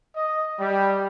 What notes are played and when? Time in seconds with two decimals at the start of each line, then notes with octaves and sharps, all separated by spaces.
0.13 D#5
0.58 G3